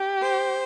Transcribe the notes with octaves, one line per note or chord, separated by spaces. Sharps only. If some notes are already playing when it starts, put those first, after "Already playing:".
Already playing: G4
C5